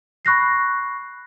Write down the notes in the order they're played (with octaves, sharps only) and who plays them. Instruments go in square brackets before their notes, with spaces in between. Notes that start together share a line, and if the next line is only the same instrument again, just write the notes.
[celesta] B5 C#6 F#6 A#6 C7